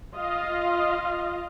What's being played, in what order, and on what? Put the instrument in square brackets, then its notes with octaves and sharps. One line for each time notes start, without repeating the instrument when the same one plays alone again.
[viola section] F4 D#5 F5